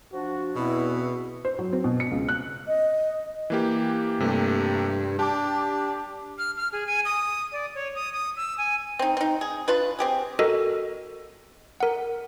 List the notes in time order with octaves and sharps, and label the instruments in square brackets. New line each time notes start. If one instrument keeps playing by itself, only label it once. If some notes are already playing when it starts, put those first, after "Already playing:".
[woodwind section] F3 D4 [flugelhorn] F#4
[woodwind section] E2 C4 [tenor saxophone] B2 [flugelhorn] B3 [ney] E4
[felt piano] C5
F#3
C4
B2
C#7
C#2
F#6
[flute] D#5
[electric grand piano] E3 A#3 G4
[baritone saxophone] G2 [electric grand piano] C3 A3 A#3
[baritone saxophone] D4 [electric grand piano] G4 A5 D6
[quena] F6
F6
G#4
G#5
D#6
D5
C#5
D#6
D#6
E6
G#5
[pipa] C4 D#4
C4 D#4
G#4
D4 F4 B4
C4 G4 G#4
[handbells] F#4 A4 A#4 D#5
A#4 F#5